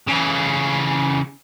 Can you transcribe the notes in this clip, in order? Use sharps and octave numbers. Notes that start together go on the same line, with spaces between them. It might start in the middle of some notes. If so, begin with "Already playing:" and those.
C#3 E3